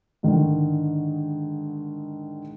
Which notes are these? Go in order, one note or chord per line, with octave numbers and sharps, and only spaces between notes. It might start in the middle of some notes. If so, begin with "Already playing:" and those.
G#2 D3 D#3